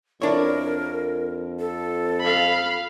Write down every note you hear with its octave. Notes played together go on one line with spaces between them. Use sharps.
F2 D4 E4 A#4 C#5
A4
F5 B5